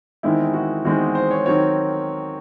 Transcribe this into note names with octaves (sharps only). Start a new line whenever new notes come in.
E2 D#3 G#3 C4 E4
F#4
E2 D#3 G#3 C4 F#4
C5
C#5
D#3 F#3 C4 C#5